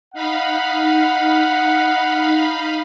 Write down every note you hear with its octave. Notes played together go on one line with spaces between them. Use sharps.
D#4 F5 F#5 B5